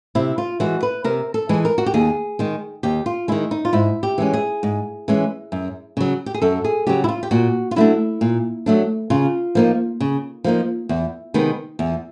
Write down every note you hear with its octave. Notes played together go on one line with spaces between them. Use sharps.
C3 E4
F4
E3 G#3 F#4
B4
C3 A#4
A4
E3 G#3
A#4
F#4
G4
D#2 G#4
D#3 G#3
D#2 G4
F4
D#3 G#3 E4
D#4
F4
G#2 E4
G4
E3 G#3 C#4
G#4
G#2
E3 G#3 C#4
F#2
C#3 F#3
G4
G#4
F#2 A4
G#4
C#3 F#3 G4
E4
F4
G4
A#2 F#4
F4
F#3 A3 D4 E4
A#2
F#3 A3 D4
C#3 F4
F3 A#3 D#4
C#3
F3 A#3 D#4
E2
C3 D#3 G#3 B3
E2